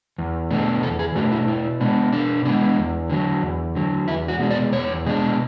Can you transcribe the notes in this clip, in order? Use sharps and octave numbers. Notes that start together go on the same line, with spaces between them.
E2
B2 A3 D4
E2 A4
G#4
B2 A3 D4 F#4
E4
B2 E4
G#3 B3 D4
B2 D4
G#3 B3 D4
E2
D3 F#3
E2
D3 F#3
E2 E4
F#4
B2 G#3 D4
D5
E2 C#5
B2 G#3 D4